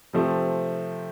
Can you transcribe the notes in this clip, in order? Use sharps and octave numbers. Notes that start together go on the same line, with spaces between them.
C3 F3 A3 C4